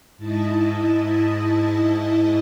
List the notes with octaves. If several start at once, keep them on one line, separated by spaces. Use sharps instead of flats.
G#2 E4 D#5 A5